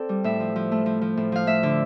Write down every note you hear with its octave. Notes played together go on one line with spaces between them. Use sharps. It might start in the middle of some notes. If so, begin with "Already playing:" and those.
Already playing: C4 A4 D5
G3
A2 E5
F3
F3
A3
F3
F3
A2
F3 F5
A3 E5
D3